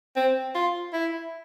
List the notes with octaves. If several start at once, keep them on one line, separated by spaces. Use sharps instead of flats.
C4
F4
E4